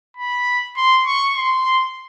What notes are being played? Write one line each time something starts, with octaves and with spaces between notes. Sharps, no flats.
B5
C6
C#6
C6